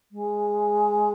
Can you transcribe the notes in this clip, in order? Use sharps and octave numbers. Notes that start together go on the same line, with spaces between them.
G#3